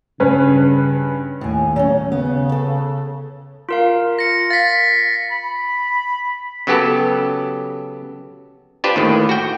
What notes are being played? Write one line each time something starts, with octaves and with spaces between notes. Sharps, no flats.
G2 C#3 C#4 B4
D#2 A2 G#5
F#3 A3 C#4
C#3 B3
A4
F4 A#4 F5
A#6 C#7
F5 A6 B6
B5
C#3 F#3 B3 G4 A4
D4 F4 G4 B4 C5
D#2 A2 D#3
F#4 G5